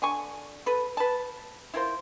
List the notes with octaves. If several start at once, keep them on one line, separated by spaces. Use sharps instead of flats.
D3 G#5 C#6
A4 B4
B4 A5
E4 F4 A#4 C5